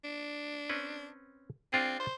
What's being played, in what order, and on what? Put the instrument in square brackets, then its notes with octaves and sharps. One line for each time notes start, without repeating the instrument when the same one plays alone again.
[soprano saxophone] D4
[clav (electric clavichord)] C4 C#4 B4
[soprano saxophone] C4 [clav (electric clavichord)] D4 F4 G#4
[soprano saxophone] C5